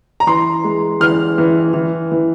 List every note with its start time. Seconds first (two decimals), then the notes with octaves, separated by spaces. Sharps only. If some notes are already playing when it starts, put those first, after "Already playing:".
0.20 A#5
0.27 E3 C6
0.64 G#3
1.00 E3 F6
1.38 E3
1.74 E3
2.12 E3